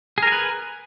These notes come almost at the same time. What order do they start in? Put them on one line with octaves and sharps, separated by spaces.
G#4 A#4 G#5 B4